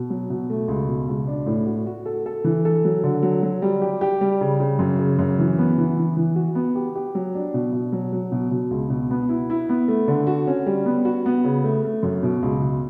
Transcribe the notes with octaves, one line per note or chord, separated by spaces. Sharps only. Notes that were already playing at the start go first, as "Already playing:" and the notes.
Already playing: B2
F#3
B2
A3
C#2
B2
C#2
D4
A2
F#4
F#4
A4
A4
E3
A4
F#3
D3
F#3
F#3
G3
G4
G4
G3
C#3
C#3
F#2
C#3
F#2
E3
B3
E3
E3
E3
F#4
B3
G4
G4
F#3
D4
B2
B2
F#3
F#3
B2
B2
C#2
B2
B3
E4
E4
B3
A3
D3
F#4
C#4
G3
B3
F#4
B3
C#3
A3
A3
F#2
B2
C#2
B2